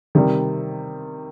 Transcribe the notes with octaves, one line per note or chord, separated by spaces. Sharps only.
C3 D#3 G3